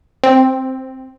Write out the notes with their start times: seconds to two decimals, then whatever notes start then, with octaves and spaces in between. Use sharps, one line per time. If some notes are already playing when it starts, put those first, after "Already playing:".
0.24 C4